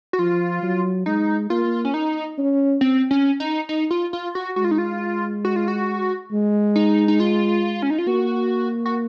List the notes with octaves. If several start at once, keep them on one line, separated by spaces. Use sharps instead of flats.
F#4
F3 F4
F#3
G#3 D#4
A#3 F4
C#4
D#4
C#4
C4
C#4
D#4
D#4
F4
F4
F#4
G#3 F#4
F4
D#4
F4
F#4
F4
F#4
G#3
D#4
D#4
F4
C#4
D#4
F4
A#3 F#4
F#4